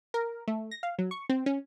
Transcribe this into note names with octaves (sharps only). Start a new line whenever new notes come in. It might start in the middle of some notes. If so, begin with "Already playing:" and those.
A#4
A3
A#6
F5
F#3
C#6
C4
C#4